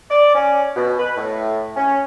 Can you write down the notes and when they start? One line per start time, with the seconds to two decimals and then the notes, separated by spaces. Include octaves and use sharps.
0.10 D5
0.35 C#4
0.76 B2
0.99 B4
1.17 A2
1.76 C#4